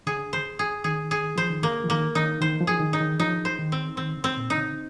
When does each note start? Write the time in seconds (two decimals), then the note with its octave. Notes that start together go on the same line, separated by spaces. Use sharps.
0.07 D3 G#4
0.33 C5
0.59 G#4
0.84 D#3 G#4
1.11 G#4
1.36 F3 C5
1.50 D#3
1.63 D3 A#3
1.84 F3
1.89 D#3 A#3
2.15 D#3 D#4
2.41 D#3 C5
2.60 F3
2.67 G#4
2.80 D#3
2.93 D#4
3.00 D#3
3.20 F3 D#4
3.45 C5
3.59 D#3
3.72 C4
3.97 D#3 C4
4.17 D3
4.24 C4
4.36 A#2
4.50 D#4
4.57 D3